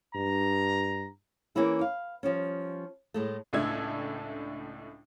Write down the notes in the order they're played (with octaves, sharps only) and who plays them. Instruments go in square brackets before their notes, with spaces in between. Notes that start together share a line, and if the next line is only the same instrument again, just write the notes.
[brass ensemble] G2 A#5
[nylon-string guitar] E3 A#3 C#4 E4 G#4
F5
F3 G3 C#4
A2 G#3 A3
[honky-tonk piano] C#2 A2 A3 D4 E6 G#6